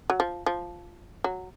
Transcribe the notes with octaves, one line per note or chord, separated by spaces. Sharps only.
F#3
F3
F3
F#3